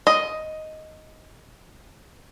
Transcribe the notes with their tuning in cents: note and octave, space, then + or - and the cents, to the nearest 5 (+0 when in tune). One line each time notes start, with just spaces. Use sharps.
D#5 +5